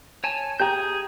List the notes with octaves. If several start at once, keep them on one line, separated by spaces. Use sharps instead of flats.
C#5 G#5 A5
G4 G#4 G5 A#5 G6